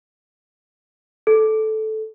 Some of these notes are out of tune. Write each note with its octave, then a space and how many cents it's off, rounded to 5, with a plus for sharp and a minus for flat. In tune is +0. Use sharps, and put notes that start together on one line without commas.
A4 -10